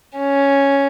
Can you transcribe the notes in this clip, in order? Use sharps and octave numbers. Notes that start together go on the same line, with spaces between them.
C#4